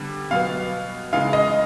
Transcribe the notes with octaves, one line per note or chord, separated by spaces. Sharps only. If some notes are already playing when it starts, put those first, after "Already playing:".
Already playing: D3 G3 B3
B2 F#3 B3 F5
C#3 E3 G#3 F5
D#5